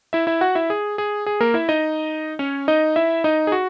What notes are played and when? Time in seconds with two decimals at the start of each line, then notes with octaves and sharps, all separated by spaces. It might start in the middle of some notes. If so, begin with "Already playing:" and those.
0.13 E4 E5
0.27 E4 E5
0.41 F#4 F#5
0.55 E4 E5
0.70 G#4
0.98 G#4
1.26 G#4
1.40 A#3 A#4
1.54 E4 E5
1.69 D#4 D#5
2.39 C#4 C#5
2.68 D#4 D#5
2.96 E4 E5
3.24 D#4 D#5
3.47 G#4
3.52 F#4